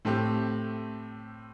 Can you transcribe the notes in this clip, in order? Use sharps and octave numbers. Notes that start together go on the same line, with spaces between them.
A2 A3 C4 G4